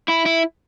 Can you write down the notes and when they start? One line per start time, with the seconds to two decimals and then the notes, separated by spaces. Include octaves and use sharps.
0.08 E4
0.26 E4